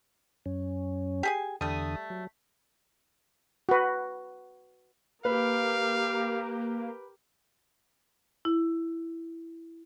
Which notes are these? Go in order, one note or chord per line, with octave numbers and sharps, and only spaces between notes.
F#2 C#4
G4 G#4 G#5
E2 D3 G3 A3 D#6
F#3
F#4 B4
A#3 G4 A#4 B4 F5
E4